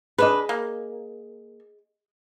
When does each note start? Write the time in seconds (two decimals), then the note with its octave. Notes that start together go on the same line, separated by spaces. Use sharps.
0.18 D4 G#4 B4 D#5
0.49 A#3